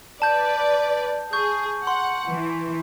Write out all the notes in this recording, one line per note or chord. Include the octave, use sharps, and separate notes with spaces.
B4 D5 A5 G6
G#4 C#6 G6
F#5 C6
E3